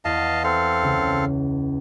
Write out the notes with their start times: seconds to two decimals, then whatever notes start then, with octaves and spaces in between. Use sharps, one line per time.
0.05 E2 D#5 F5 A5
0.44 C4 A4 F5
0.82 C#2